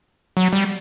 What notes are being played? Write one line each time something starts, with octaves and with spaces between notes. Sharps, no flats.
F#3
G3